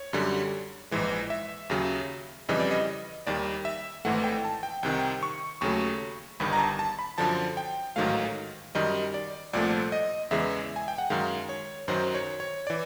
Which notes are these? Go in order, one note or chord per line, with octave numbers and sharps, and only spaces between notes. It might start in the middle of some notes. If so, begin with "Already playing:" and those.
Already playing: C#5
F#2 D3 G3
A#1 G#2 E3 G#3
E5
D#2 C#3 F#3
F2 C#3 E3 G3 D#5
D5
D#5
D#2 D#3 G3 D5
E5
G#1 G#2 E3 A3 F#5
G5
A5
G5
C2 C3 D#3 G5
C#6
D#2 C#3 F#3 A3 C#6
G1 G2 D#3 B5
A#5
A5
A5
B5
F#2 D3 F3 A5
G5
A1 G#2 D#3 F#3 A3 F5
F#2 D#3 G3 D#5
D5
C2 A#2 F3 A3 D5
D#5
E2 C#3 E3 G#3 E5
G#5
G5
F#5
F#2 D#3 G#3 F5
C#5
F#2 D#3 F#3 C5
C#5
C#5
E3 D5